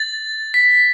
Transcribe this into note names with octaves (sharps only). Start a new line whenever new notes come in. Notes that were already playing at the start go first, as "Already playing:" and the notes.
Already playing: A6
B6